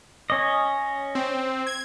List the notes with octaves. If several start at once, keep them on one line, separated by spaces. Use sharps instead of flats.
C#4 D#5
C4
G#6